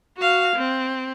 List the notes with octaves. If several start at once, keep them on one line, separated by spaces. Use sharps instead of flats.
F#4 F5
C4